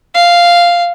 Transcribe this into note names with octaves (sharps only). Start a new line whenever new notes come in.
F5